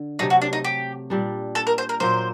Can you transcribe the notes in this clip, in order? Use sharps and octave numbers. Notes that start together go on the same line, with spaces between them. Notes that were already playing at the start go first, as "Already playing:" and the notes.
Already playing: D3
C3 F#3 A3 D#4
F#4
D4
D#4
G4
A#2 G3 D4
A4
A#4
C5
A#4
A#2 F#3 A#3 C5